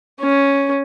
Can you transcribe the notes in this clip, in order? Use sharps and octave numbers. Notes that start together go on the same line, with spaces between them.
C#4